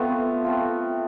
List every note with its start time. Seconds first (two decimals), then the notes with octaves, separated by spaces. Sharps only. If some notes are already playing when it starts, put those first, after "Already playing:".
Already playing: A3 B3 C4 F4 A4
0.44 A3 C4 F4